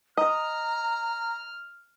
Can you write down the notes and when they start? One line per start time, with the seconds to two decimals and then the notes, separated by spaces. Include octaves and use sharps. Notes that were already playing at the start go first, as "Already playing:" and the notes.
0.17 D#5 A#5 F6